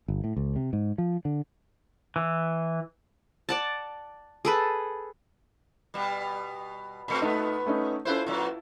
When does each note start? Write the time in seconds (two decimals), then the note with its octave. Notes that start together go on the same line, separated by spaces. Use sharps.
0.08 G1
0.24 A2
0.36 C#2
0.56 C3
0.73 G#2
0.98 F3
1.25 D3
2.16 E3
3.49 D5 F#5 A5
4.45 G#4 A4 B4
5.94 B2 G3
7.08 A#2 A3 C4 B5 C#7
7.22 A#2 A3 B3 D#4
7.66 A3 C#4 D#4
8.05 C#4 E4 F4 A4 B4 C5
8.26 A#2 F#3